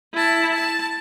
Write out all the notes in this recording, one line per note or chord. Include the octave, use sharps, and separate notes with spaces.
E4 A5
A5